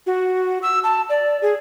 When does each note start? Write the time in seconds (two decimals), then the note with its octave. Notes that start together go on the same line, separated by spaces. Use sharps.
0.06 F#4
0.62 E6
0.84 A5
1.09 D5
1.42 G#4